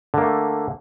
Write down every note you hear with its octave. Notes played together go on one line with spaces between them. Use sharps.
D3 A3 A#3